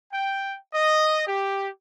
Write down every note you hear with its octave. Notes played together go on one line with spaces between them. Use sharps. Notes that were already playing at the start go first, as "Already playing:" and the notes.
G5
D#5
G4